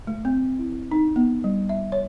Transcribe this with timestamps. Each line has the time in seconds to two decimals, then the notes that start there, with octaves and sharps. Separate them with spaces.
0.07 A3
0.25 C4
0.59 E4
0.91 D#4
1.16 B3
1.44 G3
1.69 E5
1.92 C#5